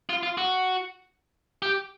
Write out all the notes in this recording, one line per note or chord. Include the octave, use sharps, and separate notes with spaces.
F4
F4
F#4
G4